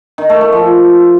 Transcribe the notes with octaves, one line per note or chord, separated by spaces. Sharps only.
D#3
A3
A3
F3